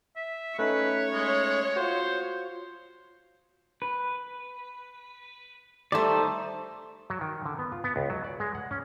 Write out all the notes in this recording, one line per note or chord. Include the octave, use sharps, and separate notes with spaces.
E5
A3 C#4 D#4 B4 C#5
G#3
F4 F#4 C5
B4
G3 A3 D#4 C5 D5
F#3
D#3
D3
B3
F4
B3
C#2
F#3
D5
G#3
F#5
C#4